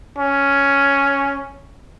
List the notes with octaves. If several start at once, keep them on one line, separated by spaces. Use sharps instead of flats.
C#4